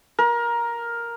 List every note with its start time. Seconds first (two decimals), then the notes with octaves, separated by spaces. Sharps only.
0.19 A#4